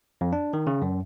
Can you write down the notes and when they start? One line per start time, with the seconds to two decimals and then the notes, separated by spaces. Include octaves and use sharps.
0.21 F2
0.33 D4
0.53 D#3
0.67 C#3
0.82 F#2